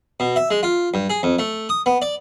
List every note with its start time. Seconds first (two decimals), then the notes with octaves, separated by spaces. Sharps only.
0.20 B2
0.36 E5
0.51 G#3
0.63 F4
0.94 G2
1.10 G#4
1.23 F2
1.39 A3
1.69 D#6
1.86 B3
2.02 D5